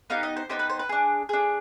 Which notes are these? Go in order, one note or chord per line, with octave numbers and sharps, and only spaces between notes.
B3 D#4 G4 F5
D#5
C5
B3 D#4 G4 C5
B4
C5
B4
D4 G#4
D4 G#4